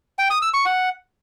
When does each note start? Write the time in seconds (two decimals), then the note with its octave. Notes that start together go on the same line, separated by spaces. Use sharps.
0.19 G5
0.30 D#6
0.42 E6
0.54 C#6
0.65 F#5